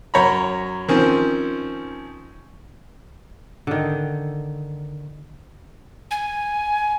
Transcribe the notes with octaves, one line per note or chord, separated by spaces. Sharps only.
F#2 C#5 A#5 B5
D#3 F3 C4 C#4
D3 D#3
G#5